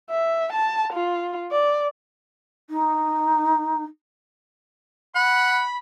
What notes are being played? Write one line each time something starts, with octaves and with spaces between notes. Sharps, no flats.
E5
A5
F4
D5
D#4
F#5 B5